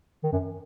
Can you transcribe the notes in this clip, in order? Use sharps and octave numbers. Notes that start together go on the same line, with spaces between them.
D#3
F#2